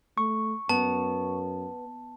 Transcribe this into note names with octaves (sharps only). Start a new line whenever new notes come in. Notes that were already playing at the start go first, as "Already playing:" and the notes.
A3 C#6
F#2 B3 A5